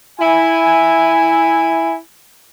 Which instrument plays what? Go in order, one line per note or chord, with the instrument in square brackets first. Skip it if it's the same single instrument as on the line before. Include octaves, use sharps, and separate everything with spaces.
[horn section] E4 G#5